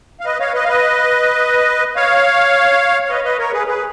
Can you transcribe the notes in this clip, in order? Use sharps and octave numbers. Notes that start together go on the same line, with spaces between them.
F5
B4 D#5
C#5 F5
B4 D#5
F5
B4 D#5
C#5 F5
C#5
B4 D#5
B4 D#5
A#4 C#5
G#4 B4
G#4 B4